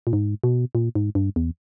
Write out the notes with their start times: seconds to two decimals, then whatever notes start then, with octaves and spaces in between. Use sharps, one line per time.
0.07 A#2
0.13 G#2
0.44 B2
0.75 A#2
0.95 G#2
1.15 G2
1.36 E2